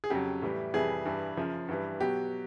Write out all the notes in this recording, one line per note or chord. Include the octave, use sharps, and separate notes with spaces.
G#4
F2 C#3 F#3 G4
A2 E3 G3
F2 C3 E3 G3 G#4
G2 E3 G3
F#2 C#3 F3
G2 E3 G3
B2 F#3 G4